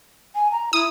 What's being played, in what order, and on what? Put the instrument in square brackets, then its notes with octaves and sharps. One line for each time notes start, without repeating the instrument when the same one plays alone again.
[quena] G#5
A#5
[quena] E4 [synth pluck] D#6